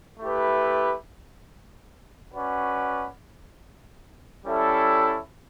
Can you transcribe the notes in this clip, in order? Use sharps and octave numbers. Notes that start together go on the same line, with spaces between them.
A3 E4 G4 B4
C#4 F#4 B4 D5 F#5
G3 C#4 E4 A4 E5